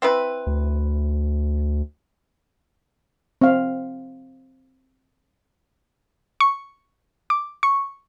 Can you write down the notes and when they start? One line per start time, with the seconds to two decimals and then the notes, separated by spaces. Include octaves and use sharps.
0.02 C4 E4 B4
0.47 D2
3.41 C4 F5
6.40 C#6
7.30 D6
7.63 C#6